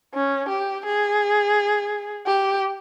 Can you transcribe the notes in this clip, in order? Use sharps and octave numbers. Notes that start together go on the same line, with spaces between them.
C#4
G4
G#4
G4